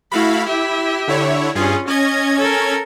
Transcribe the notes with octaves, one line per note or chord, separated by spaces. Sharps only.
A3 E4 F#4 F5 B5
E4 G4 E5
D3 E4 C#5
G2 C#4 F4 G#4
C#4 D#5 G#6
A4 A#4